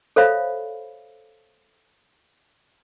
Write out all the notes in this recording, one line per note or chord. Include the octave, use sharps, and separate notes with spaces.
A4 C5 C#5 E5 F5 B5